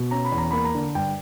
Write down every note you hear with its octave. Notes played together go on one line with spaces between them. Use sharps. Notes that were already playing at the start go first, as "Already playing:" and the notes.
Already playing: B2
C#4 A#5
B5
E2
A#5
A#3 B5
A#5
D3
G2 G5